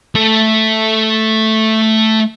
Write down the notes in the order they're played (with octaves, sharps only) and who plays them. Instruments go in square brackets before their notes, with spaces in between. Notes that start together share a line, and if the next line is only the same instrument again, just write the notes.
[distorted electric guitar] A3 A4